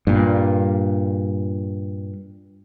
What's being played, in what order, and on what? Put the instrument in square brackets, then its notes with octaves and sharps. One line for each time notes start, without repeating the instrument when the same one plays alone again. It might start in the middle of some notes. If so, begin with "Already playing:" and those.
[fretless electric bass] G2 A#2